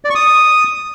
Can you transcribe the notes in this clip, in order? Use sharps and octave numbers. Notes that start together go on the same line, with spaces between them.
D5
C#6
D#6